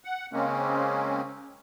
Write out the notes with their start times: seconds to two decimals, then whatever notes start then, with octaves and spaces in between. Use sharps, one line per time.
0.05 F#5
0.33 C#3 G#3 A#3 C4 C#4